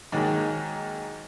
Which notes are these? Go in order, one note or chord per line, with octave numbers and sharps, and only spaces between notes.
G#2 D#3 F#3 A#3